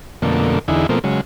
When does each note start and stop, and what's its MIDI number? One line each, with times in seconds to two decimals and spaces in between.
0.22 0.59 41
0.22 0.59 47
0.22 0.59 50
0.22 0.59 57
0.22 0.59 58
0.68 0.87 40
0.68 0.87 50
0.68 0.87 63
0.68 0.87 64
0.68 0.87 68
0.89 0.99 47
0.89 0.99 53
0.89 0.99 57
0.89 0.99 58
0.89 0.99 60
1.04 1.21 49
1.04 1.21 54
1.04 1.21 56